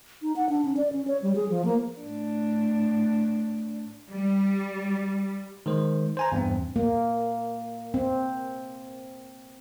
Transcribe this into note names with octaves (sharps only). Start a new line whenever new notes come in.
D#4
F#5
D4
C#4
D5
C#4
C#5
G3
G#4
F3
A#3
A2 D4
G3
D#3 G#3 C5
C5 G#5 A#5
E2 G2 C4
A#3
C4